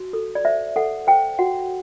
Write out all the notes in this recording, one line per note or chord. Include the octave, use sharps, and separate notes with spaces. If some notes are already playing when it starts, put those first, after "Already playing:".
Already playing: F#4
A4
D5
C5 E5
A4 F#5
C5 G5
F#4 F#5